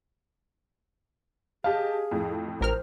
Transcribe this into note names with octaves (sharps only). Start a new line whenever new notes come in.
G4 G#4 D#5 F5 A5
F2 A2
A1 A#4 C5 F6